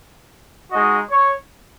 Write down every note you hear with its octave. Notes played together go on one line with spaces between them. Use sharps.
G#3 D#4 F#4 D#5
C#5